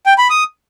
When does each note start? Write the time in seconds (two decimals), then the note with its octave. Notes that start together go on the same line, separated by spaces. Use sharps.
0.06 G5
0.18 B5
0.30 D#6